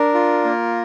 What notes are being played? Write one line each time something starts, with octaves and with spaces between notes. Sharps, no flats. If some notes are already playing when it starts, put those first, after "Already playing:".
Already playing: D4 A#4
F4
A#3